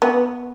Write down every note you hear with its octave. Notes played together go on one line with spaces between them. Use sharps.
B3